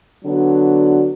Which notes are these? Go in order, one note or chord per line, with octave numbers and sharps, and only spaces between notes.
D3 F#3 B3 D4 F#4